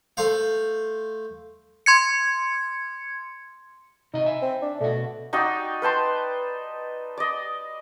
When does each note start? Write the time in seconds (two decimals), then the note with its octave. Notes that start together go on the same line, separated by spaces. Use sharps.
0.17 A3 C5 F5
1.86 C6 G#6 C#7
4.14 C3 D#4 D#5
4.26 E5 G#5
4.42 C4
4.62 D4
4.81 B2 A3 F#4
5.33 D#4 F#4 D5 G5
5.82 B4 G5 A5 C6
7.18 D5 D#5